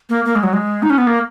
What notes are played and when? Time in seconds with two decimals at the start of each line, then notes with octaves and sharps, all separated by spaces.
0.09 A#3
0.25 A#3
0.35 G#3
0.43 F#3
0.53 G#3
0.83 D#4
0.90 C#4
0.98 B3
1.07 A#3